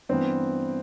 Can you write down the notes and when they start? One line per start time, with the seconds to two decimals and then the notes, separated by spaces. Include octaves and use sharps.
0.09 G2 E3 B3 C4